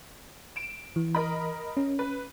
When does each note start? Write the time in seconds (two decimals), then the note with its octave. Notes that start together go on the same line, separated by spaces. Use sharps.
0.56 D7 E7
0.96 E3
1.15 A#4 D#5 B5
1.77 C#4
1.99 B4